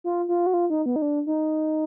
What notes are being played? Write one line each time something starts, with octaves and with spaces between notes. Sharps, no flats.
F4
F4
F#4
F4
D#4
B3
D#4
D4
D#4